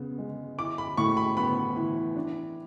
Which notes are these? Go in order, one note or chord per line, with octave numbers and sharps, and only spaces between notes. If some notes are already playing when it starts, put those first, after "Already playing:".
Already playing: C#3 B3
G#3
E4 D6
B5
A2 C#6
B5
B3 B5
E3
D4